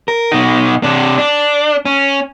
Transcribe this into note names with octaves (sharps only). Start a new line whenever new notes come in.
A#4
B2 D#4
C3 D4
D4
C#4